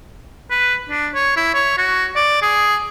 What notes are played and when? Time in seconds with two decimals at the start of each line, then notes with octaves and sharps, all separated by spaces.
0.51 B4
0.89 D4
1.14 C#5
1.37 E4
1.54 C#5
1.78 F#4
2.16 D5
2.42 G#4